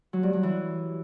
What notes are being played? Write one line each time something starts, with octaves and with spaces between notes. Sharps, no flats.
F#3
G2
F#3
E3